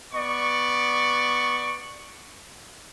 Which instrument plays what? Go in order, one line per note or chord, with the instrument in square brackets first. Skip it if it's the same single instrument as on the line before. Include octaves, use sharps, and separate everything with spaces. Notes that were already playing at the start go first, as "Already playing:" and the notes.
[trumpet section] B3 D5 C#6